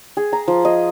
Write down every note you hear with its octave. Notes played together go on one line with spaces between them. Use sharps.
G#4
A#5
F3
D#5